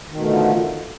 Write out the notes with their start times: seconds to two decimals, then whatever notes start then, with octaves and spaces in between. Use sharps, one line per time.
0.10 D#3
0.14 B2
0.18 A3
0.23 D3
0.27 F3